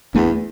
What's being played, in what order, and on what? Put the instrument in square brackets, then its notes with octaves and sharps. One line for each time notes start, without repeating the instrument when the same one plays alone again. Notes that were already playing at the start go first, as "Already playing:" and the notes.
[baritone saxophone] E2 [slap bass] A3 D4